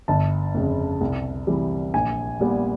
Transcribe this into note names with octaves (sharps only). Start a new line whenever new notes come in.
G1 A5
F2 C#3
C2
C3 E3 G3
A#1 G#5
A#2 G3 B3